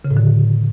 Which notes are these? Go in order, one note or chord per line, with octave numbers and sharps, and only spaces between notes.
C#3
A2
D3